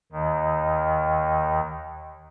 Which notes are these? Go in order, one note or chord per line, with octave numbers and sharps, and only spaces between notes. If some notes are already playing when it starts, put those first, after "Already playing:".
D#2 D#3